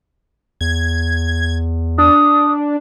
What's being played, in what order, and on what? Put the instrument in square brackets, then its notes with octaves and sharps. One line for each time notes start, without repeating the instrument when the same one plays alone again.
[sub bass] E2 [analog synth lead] G#6
[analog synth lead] D4 [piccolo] D#6